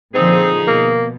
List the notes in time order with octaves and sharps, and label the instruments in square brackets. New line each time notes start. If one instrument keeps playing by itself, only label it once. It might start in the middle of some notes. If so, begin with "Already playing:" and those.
[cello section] A#2 D3 F3 [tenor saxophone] C4 [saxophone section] D#4 G#4
[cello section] B2 [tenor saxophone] A#3